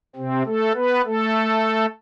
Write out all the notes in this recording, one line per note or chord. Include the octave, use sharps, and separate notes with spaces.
C3 C4
A3 A4
B3 B4
A3 A4